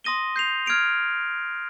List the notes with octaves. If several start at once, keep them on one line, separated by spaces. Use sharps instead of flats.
C6 D#6 A#6 D#7 G7
G6 C7 F7
F6 G#6 D7 F7